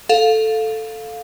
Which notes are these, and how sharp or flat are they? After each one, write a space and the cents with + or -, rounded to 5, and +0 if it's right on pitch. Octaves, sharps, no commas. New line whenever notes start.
A4 +0 F5 +10